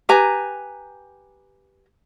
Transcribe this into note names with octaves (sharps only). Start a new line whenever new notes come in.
G4 B4 G#5 A#5